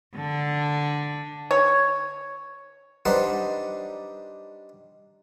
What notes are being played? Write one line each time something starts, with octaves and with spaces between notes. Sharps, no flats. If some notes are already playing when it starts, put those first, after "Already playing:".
D3 D4
C#5
G3 D4 D#4 B4 C5 F#5